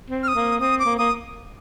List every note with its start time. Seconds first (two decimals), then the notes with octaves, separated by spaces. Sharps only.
0.10 C4
0.23 F6
0.28 D#6
0.35 A#3
0.60 C4 D#6
0.79 D6
0.85 A#3
0.98 A#3 D#6